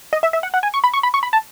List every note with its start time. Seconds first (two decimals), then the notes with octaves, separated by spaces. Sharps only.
0.13 D#5
0.23 E5
0.33 E5
0.43 F#5
0.54 F#5
0.63 G#5
0.74 C#6
0.84 B5
0.94 C#6
1.03 B5
1.14 C#6
1.23 B5
1.33 A5